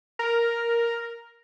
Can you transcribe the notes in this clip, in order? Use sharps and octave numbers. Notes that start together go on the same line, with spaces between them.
A#4